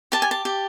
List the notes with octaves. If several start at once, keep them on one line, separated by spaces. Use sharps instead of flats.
G4 A5
G#5
A5
G4